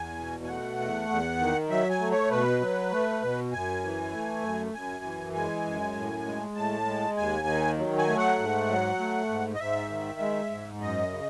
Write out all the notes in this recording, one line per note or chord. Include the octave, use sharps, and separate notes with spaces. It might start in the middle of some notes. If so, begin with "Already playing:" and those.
Already playing: E2 G#5
B2
G#5
A3 F#5
E2
E2
D#3
F#3 E5
G#5
A3
C#5
B2 B4
F#3
A3
B2
F#2 G#5
E3
A3
F#2
F#2 G#5
E3
G#3 G#5
F#2
A2
G#3
A2 A5
G#3
D#2 G#5
D#3
F#3
G#5
A3
F#5
G#2
F#3
A3
G#2
D#5
G#2 E5
D#3
G#3
G#2
F#2 D#5
C#3